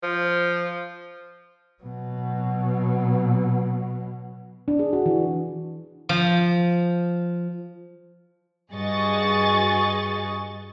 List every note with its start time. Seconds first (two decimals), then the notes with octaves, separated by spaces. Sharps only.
0.03 F3
1.83 B2 F#3
4.68 D4
4.79 G#4
4.93 F#4
5.06 E3
6.09 F3
8.71 G2 F#4 G#4 D#5 C#6 A6